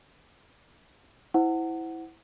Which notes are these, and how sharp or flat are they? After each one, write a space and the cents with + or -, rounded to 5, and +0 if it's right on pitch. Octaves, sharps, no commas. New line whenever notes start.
E4 -10 C5 -15 F#5 +0